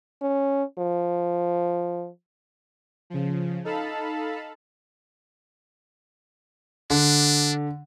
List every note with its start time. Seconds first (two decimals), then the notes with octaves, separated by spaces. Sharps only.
0.21 C#4
0.79 F3
3.10 C#3 F3
3.64 D#4 A4 F5 A5 B5
6.90 D3 D4